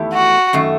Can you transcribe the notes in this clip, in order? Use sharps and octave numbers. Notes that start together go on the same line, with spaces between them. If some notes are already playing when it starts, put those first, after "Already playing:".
Already playing: E2 D#3 A3 E4 G4
F#4
F#2 D#3 A3